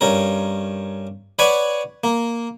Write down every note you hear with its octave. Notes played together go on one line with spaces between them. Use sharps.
G2 C#4 A#4
B4 C#5 D5 F#5 G#5
A#3